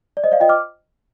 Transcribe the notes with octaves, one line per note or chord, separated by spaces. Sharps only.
D5
C5 D#5
D5 F5
F4 D#5 G5
D6 F6